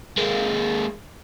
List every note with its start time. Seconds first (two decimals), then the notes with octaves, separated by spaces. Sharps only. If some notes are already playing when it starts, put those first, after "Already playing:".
0.18 G#3 A#3